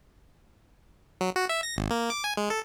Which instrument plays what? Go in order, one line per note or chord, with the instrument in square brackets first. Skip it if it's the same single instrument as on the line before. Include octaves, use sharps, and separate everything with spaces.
[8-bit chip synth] F#3
F#4
E5
A#6
G#1
A#3
D6
G#5
G#3
A4